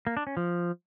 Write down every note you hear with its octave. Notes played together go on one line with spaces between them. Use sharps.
A#3
D4
C#4
F3